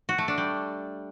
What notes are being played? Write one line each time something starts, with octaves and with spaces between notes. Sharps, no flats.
F#4
A3
D4
G3